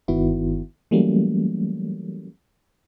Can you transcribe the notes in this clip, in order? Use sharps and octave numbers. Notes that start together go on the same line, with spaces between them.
G1 D#3 B3 E4 F#4
E3 F#3 G3 A3 A#3 C#4